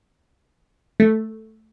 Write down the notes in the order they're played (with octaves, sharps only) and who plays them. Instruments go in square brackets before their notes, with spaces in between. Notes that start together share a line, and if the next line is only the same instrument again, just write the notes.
[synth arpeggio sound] A3